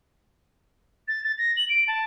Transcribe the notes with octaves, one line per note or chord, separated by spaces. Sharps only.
A6
A6
A#6
F#7
D7
A5